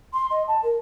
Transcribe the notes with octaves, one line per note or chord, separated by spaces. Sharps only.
C6
D#5
A5
A#4